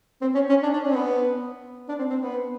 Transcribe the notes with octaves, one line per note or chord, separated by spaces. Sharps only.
C4
C#4
C#4
D4
D4
C#4
C4
B3
D4
C4
C4
B3